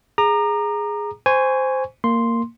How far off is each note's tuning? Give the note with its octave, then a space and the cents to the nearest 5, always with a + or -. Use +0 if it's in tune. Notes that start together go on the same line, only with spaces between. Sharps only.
G#4 +0 A#5 +0 D6 +45
C5 -10 G#5 -5 C#6 +15
A#3 -15 C6 +0